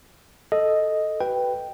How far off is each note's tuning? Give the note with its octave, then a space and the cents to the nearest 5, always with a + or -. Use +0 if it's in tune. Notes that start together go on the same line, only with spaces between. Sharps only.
A4 +0 D#5 +0
F#4 +40 B4 +0 G5 +0